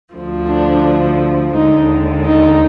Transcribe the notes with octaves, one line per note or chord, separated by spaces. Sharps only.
D2 D3 F3
D4
D#2 D3 G#3 D#4
D#4